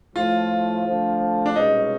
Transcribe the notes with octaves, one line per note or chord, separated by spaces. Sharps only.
A2 F3 A3 F4
D3 F3 A3
D4
C2 B2 G#3 C#4 D#4